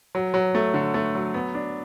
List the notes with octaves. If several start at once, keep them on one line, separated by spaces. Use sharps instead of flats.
F#3
F#3
A3
D3
A3
F#3
B3
D4